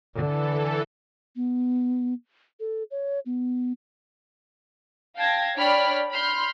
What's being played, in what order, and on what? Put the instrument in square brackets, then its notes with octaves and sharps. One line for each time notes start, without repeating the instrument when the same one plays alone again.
[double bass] D3 [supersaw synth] E3 A4
[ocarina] B3
A4
C#5
B3
[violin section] F5 G5 A5 G#6 A#6
D4 C#5 D5 G5 B5 F6
B5 C6 F6 G6